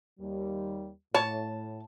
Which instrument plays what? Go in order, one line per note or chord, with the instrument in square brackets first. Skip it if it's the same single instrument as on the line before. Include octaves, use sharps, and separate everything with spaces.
[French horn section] D#2 G3
[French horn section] A2 [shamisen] C#5 [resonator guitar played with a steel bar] A5